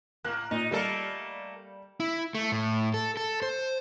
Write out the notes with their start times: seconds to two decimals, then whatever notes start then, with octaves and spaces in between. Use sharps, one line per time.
0.25 A2 A#3 F#6
0.51 A#2 D#4
0.71 G3 A3 A#3 A4
2.00 E4
2.35 A3
2.52 A2
2.94 A4
3.17 A4
3.42 C5